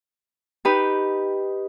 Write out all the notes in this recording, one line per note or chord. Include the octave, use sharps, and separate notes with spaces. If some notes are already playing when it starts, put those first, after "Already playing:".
D#4 G4 B4